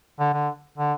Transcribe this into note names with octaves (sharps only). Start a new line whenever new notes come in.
D3
D3
D3